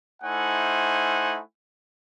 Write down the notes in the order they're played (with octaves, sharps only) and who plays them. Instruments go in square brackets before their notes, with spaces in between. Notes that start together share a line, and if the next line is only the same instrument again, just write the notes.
[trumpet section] A3 D#4 E4 C5 F#5 G#5